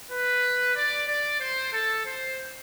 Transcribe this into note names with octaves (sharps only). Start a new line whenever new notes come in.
B4
D5
D5
C5
A4
C5